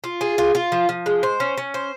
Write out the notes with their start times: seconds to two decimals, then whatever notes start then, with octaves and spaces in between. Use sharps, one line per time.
0.04 F4
0.21 G#4
0.38 F4
0.55 F4
0.72 F3
0.89 F3
1.06 G#3
1.23 C5
1.40 C#4
1.58 C#4
1.74 C5